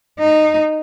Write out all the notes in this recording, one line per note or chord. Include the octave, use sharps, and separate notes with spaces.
D#4